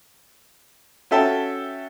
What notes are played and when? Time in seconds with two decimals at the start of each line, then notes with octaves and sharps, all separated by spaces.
1.11 C#4 F#4 A4 E5 G5 A5